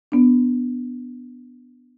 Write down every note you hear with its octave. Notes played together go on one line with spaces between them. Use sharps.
B3 D4